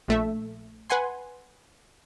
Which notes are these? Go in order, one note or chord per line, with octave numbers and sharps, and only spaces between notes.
A#1 A3 E5
B4 F#5 G#5 C6